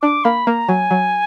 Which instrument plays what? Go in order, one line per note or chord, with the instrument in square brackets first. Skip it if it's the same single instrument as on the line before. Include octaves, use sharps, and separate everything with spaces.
[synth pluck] D4 [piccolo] D6
[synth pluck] A#3 [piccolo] B5
[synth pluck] A#3 [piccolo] A#5
[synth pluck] F#3 [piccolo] G#5
[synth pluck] F#3